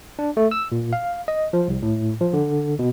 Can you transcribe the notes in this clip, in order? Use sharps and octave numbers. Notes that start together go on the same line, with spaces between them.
D4
A3
E6
A#2
F5
D#5
F3
C2
A2
F3
D3
B2